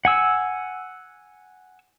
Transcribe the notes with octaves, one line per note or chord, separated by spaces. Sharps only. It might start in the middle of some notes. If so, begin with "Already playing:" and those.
F#5 G#5 E6